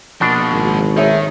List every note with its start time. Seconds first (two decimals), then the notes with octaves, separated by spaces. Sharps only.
0.21 B2 F3 A#3 D4
0.52 G#1
0.97 D#3 G#4 C#5 E5